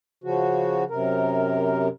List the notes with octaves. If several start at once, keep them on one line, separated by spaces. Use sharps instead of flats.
C#3 F3 F#4
F#2 C3 A#4